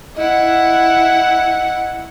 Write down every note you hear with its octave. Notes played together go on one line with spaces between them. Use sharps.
E4 D#5 F#5